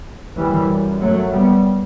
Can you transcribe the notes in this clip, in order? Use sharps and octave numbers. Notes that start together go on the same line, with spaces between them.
F#2 E3 G3
F#3 A3
G3 B3